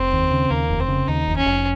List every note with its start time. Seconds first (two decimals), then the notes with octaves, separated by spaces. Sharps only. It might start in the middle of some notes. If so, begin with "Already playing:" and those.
Already playing: F1 C4
0.13 D#2
0.31 C#3
0.50 D#2 A#3
0.70 F1
0.80 C4
0.88 C#3
1.08 D#2 D#4
1.27 F1
1.37 C#4
1.46 F1